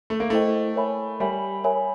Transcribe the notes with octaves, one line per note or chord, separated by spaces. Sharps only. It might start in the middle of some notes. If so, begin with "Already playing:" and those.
A3
A#3
A3 E4 A4 C5 D#5 G5
A#4 C#5 E5 G#5 B5
G3 A#4 C#5 E5 G#5 B5
A#4 C#5 E5 G#5 B5